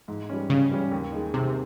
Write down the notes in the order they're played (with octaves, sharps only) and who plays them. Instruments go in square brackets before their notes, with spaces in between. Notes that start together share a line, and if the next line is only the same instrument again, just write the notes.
[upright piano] G#2
G3 C#4
[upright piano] G#2 [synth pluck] C#3
[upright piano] G3 C#4
D#2
D#3 G#3 D#4
[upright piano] D#2 [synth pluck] C3